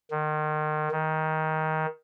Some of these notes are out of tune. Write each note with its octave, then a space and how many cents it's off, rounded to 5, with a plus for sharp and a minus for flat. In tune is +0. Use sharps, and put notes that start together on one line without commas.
D#3 -30
D#3 +15